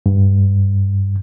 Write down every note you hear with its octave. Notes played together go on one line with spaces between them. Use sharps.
G2